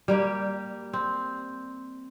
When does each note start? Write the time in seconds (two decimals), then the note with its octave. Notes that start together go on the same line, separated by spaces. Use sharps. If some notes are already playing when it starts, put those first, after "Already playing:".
0.08 G3 A#3 G4
0.93 C4